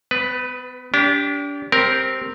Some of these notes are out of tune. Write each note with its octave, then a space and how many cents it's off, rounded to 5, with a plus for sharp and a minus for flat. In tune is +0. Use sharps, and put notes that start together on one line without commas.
B3 +35 B4 +0
D4 -35 G4 +0
C4 +0 G4 +0 A#4 +0